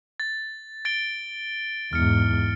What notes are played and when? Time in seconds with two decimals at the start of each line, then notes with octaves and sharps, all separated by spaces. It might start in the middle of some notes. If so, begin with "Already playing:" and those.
0.20 A6
0.85 A6 D7 G7
1.93 E2 G#2 F6 C#7